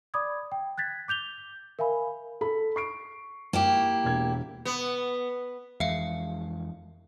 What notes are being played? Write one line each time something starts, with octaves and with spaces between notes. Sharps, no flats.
D5 B5 D6 D#6 G#6
G5
F#6 G#6 A6 B6
D6 G6 F7 G7
A#4 E5 F5 G#5 B5
A4 B5
C#6 C7 D7
A#3 E4 G4
E1 G#6
B3
F2 E3 G#3 E5 F5